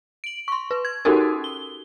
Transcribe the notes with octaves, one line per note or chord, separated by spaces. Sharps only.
D7 F#7
C6 C#6
B4
G#6
C#4 D#4 F#4 G4 A4 A#4
G7